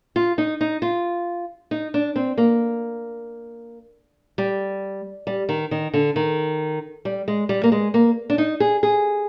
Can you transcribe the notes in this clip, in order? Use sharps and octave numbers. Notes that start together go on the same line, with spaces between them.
F4
D#4
D#4
F4
D#4
D4
C4
A#3
G3
G3
D#3
D#3
D3
D#3
G3
G#3
G3
A#3
G#3
A#3
D4
D#4
G#4
G#4